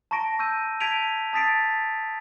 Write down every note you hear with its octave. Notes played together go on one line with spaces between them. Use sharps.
A5 A#5 C#6 A#6 D7
C#6 E6 G6 D#7
A5 G#6 B6 D7 D#7 F7
A5 D#6 A6 B6 C7 D7